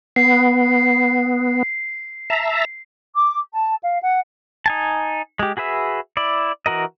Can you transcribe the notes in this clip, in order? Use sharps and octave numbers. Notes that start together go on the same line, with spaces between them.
B3 C7
E5 A5 A#5
D6
A5
F5
F#5
D#4 G#5 A5
G#3 G4
F#4 G#4 B4 E5
E4 D5
E3 F#4 A#4 D#5